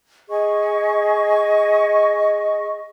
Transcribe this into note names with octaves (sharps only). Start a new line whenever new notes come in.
G#4 D#5 C#6